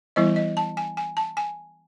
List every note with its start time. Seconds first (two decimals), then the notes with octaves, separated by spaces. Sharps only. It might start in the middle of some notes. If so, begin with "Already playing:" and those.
0.16 E3 G3 B3 E4 D#5
0.36 D#5
0.57 A5
0.77 G#5
0.97 G#5
1.17 A5
1.37 G#5